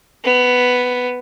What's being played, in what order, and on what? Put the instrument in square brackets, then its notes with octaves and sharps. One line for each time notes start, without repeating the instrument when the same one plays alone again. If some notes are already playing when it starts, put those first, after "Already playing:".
[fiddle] B3